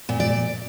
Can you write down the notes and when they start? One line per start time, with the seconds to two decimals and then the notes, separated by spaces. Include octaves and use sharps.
0.09 A#2
0.20 D5